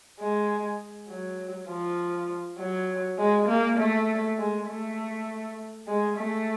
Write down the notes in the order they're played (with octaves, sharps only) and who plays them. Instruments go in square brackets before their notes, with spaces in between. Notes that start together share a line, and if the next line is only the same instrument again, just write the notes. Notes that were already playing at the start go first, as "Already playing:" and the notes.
[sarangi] G#3
F#3
F3
F#3
G#3
A#3
A3
G#3
A3
G#3
A3